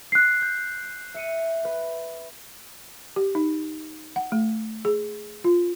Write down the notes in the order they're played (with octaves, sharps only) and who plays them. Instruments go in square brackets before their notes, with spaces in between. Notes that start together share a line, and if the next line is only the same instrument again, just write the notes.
[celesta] F#6 C7
[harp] G6
E5 C#7 D#7
B4
[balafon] G4
D#4
F#5
A3
G#4
F4